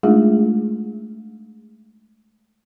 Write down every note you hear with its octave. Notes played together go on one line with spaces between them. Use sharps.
G#3 A3 D4 D#4 F4 G#4